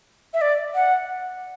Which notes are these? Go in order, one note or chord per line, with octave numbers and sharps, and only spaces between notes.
E5
D5
F#5